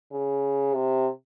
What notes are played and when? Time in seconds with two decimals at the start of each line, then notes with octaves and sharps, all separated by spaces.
0.12 C#3
0.74 C3